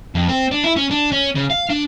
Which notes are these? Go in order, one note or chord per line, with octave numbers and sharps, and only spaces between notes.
F2
C4
D4
E4
C#4
D4
C#4
C#3
F5
D4